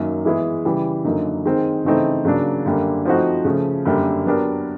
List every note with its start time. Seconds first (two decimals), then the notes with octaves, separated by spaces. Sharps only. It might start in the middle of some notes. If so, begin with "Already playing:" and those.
Already playing: F#2 D#3 F#3 A#3
0.25 E3 G#3 B3 E4 G#4
0.65 C#3 E3 G3
1.05 F#2 D3 F#3 A#3 D#4
1.45 D#3 G#3 C4
1.85 C#3 E3 A3 C4 D#4
2.25 C#3 F#3 A#3 D4
2.66 F#2 D3 G3 A#3
3.05 F3 A3 C4 D#4 F#4
3.45 C#3 F3 A3
3.85 F#2 D3 G3 A#3
4.25 F#3 B3 D4 G4 A#4